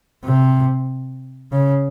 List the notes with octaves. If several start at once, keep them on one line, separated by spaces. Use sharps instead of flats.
C3
C#3